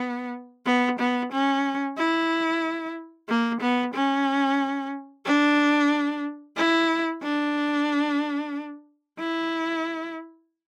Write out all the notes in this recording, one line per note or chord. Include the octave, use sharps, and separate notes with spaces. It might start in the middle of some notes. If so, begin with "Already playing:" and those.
Already playing: B3
B3
B3
C#4
E4
A#3
B3
C#4
D4
E4
D4
E4